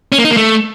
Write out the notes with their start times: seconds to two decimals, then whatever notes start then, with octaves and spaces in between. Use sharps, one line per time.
0.12 C#4
0.18 A#3
0.25 D#4
0.31 A#3
0.37 A3